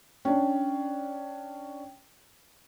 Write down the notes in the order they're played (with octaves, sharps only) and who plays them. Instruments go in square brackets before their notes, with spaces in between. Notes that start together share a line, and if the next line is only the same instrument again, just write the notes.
[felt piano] C#4 D4 [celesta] G5